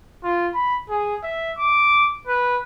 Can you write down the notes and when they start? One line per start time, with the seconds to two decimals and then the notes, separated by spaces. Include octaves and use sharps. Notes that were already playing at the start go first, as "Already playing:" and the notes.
0.24 F4
0.55 B5
0.90 G#4
1.23 E5
1.58 D6
2.27 B4